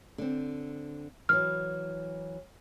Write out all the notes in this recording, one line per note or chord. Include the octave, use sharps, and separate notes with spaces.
D3 C4
E3 F#3 F6